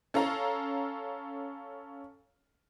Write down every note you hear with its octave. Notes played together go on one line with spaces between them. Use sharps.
C#4 A4 F5 A#5